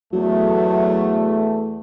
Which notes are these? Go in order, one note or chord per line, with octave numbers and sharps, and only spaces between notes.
E2 F#3 A3